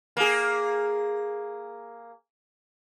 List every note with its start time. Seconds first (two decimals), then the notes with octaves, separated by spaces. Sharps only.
0.17 A#3 G#4